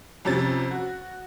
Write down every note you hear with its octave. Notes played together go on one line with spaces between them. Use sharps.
F2 C3 C#4 A6
F#4